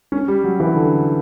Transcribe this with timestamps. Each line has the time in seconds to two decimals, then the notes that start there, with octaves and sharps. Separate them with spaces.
0.12 C#4
0.28 G3
0.44 F#3
0.60 E3
0.75 D3